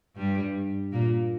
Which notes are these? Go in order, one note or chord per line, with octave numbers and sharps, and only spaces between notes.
G2 G3
A#2 A#3